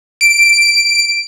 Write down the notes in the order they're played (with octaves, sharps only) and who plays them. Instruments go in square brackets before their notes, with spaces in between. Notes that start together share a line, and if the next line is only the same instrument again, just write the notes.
[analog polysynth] D7